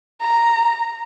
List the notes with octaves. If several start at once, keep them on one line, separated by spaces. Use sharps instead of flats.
A#5